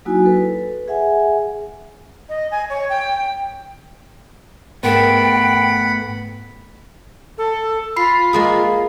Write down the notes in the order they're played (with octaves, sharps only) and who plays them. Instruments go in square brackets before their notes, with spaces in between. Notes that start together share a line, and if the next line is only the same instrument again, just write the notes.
[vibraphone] F#3 A#3 D#4 E4 F#4 G#5
A4 B4
G#4 E5 F#5 G#5
[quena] D#5
G#5
C#5
G5
[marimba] G#2 A#4 [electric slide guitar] A3 B3 [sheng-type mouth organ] F#5 B5 [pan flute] G5
[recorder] A4
[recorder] F4 [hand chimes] B5 C7
[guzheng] G#3 A#3 G#4